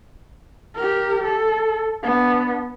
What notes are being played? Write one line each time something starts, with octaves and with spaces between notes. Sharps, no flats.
G4 A#4
A4
B3 D4